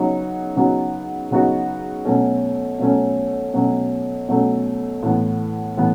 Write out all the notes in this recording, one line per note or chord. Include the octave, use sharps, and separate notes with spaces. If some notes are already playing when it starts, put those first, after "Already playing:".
Already playing: C#3 F#3 B3 D#4 F#4
C#3 F#3 B3 D#4 F#4
C#3 F#3 B3 D#4 F#4
B2 F#3 A3 C#4
B2 F#3 A3 C#4
B2 F#3 A3 C#4
B2 F#3 A3 C#4
A2 E3 B3
A2 E3 B3